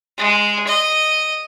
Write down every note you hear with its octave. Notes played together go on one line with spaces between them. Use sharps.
G#3
D#5